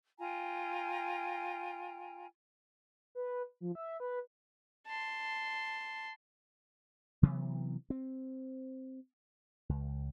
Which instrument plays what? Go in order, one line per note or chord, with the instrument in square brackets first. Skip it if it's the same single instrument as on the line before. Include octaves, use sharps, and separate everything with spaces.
[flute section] F4 G5 G#5 A#5
[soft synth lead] B4
F3
E5
B4
[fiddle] A5 C6
[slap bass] C3 E3 F#3 B3
C4
C#2